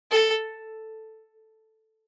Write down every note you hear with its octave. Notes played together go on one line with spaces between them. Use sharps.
A4